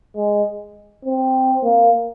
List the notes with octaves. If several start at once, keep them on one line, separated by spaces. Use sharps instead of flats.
G#3
C4
A#3